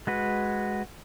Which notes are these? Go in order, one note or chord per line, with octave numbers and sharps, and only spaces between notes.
G#3 F#4 B4